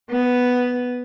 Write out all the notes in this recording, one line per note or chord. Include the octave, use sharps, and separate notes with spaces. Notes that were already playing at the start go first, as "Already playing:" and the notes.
B3